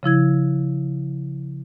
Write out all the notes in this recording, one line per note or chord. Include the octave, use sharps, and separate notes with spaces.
C#3 F3 E4 G#6